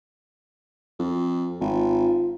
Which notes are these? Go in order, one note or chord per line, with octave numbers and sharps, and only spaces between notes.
F2
G#1 F4